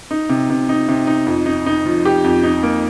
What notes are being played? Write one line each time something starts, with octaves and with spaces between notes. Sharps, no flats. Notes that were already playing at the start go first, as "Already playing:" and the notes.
D#4
C3
C3
D#4
C3
D#4
F2
D#4
D#4
F3
G4
F2
D#4
A#3